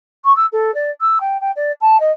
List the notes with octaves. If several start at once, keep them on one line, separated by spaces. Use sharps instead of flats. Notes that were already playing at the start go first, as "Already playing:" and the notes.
C#6
E6
A4
D5
E6
G5
G5
D5
A5
D#5